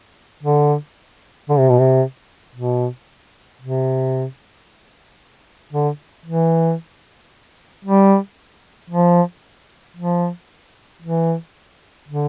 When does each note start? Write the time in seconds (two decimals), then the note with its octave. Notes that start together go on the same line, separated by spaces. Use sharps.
0.43 D3
1.49 D3
1.59 C3
1.69 B2
1.80 C3
2.55 B2
3.61 C3
5.73 D3
6.26 E3
7.85 G3
8.90 F3
9.97 F3
11.02 E3
12.09 D3